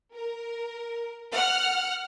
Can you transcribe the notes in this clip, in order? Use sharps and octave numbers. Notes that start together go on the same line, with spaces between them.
A#4
F#5 F6